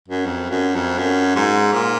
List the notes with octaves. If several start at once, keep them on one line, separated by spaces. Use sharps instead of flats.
F#2
F2
F#2
F2
F#2
G#2
A#2